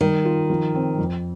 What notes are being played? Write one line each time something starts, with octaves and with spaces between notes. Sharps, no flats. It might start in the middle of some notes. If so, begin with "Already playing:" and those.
D#3 G3
F4
F3
C4
F2